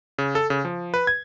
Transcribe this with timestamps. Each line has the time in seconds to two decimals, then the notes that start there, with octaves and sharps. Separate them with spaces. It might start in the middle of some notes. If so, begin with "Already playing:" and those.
0.18 C#3
0.35 A4
0.50 C#3
0.65 F3
0.94 B4
1.07 G#6